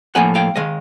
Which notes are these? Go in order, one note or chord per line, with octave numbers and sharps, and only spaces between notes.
A2 F3 A#3 F#5 G#5
F5 G5
D#3 G#3 D#5 F5